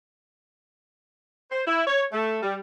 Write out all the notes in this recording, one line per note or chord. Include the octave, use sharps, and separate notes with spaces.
C5
E4
C#5
A3
G3